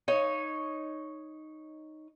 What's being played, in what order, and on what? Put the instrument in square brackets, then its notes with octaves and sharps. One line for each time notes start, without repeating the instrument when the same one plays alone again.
[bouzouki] D#4 C#5